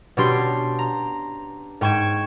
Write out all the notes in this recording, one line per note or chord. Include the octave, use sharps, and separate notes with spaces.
B2 C#4 D4 G4 C6
A#5
G#2 G5 C#6 G#6 E7